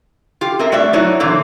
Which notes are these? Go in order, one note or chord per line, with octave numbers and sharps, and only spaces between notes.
F4 G4
C4 G#4 A#4 E5
G2 A3 F#4 D5 E5
F#3 D#4 E4 F#4 C#5 D5
A#2 D3 E3 A#3 C4